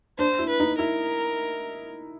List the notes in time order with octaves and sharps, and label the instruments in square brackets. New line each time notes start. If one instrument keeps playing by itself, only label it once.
[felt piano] D4 [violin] C5
[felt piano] E4
[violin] B4
[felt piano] D#4
[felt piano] E4 [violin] A#4